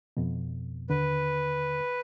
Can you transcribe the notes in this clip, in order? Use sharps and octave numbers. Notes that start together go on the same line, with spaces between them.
F2 B2
D#2 D3 B4